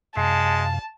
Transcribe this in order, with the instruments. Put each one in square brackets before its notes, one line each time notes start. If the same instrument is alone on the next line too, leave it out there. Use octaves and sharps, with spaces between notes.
[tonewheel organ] F#2 C3 F5 [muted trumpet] G#3 [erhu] A5